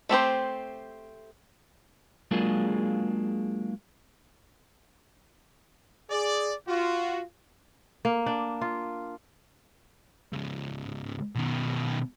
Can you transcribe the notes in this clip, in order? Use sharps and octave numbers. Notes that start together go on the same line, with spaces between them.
A3 C4 G4 C5
F#3 G#3 A#3 D4 F4 G#4
G#4 D5
F4 F#4
A#3
D4
F4
C#2 G#2
B2 D#3